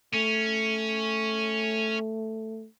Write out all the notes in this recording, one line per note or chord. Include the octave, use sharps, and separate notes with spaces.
A3 C#4